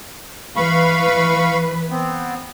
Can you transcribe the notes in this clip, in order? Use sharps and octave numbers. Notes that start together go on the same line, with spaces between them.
E3 B4 F5 B5 C#6
B3 C4